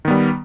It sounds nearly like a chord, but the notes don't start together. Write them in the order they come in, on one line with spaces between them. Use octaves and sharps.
D#3 B3 G3